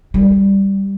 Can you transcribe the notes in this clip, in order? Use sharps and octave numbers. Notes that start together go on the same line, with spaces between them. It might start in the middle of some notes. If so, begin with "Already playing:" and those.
G3